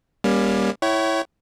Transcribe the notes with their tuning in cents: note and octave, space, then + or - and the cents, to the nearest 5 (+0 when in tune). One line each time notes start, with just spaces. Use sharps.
G3 +15 A#3 +25 C#4 +0
E4 +0 C#5 +0 G5 -45